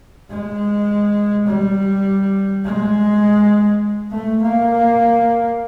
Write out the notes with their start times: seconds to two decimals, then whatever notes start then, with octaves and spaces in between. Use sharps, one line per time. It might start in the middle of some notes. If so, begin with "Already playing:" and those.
0.30 G#3
1.47 G3
2.65 G#3
4.12 A3
4.42 A#3